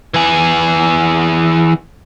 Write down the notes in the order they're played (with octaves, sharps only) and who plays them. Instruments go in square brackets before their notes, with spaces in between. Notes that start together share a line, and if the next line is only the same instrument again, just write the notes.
[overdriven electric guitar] E3 G#4